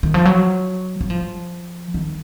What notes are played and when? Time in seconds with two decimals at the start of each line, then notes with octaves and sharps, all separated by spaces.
0.03 D#3
0.14 F3
0.25 F#3
1.01 F#3
1.10 F3
1.94 D#3